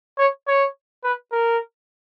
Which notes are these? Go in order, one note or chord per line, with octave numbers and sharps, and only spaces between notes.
C#5
C#5
B4
A#4